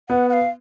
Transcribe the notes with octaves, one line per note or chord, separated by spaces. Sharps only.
B3 F#5
F#5
F5